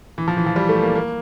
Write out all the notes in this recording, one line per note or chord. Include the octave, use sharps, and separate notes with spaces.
E3
F3
E3
F3
G3
A3
A#3
A#3